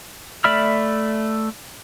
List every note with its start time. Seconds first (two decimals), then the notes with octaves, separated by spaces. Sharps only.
0.44 A3 D5 E5 B5 F6